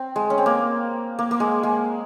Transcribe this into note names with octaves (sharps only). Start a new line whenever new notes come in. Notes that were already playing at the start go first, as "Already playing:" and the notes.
Already playing: C4
G#3
C#4
C4
A#3
A#3
A#3
G#3
G#3